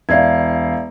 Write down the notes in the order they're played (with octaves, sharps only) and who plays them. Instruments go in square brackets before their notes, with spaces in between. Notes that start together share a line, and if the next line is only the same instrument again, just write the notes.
[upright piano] E1 F5 [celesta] D5 E5 G#6